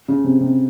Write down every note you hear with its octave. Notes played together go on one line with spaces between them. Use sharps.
C#3
C3
C3